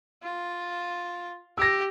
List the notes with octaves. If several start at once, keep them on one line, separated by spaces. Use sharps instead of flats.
F4
G4 E6 A#6